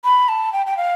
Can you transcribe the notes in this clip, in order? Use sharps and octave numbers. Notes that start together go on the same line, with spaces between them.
B5
A5
G5
G5
F5